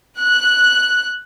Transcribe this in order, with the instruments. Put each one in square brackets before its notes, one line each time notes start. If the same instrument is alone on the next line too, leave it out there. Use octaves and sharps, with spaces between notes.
[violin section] F#6